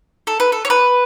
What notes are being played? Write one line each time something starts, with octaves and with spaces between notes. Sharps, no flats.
A4
B4
A4
C#5
B4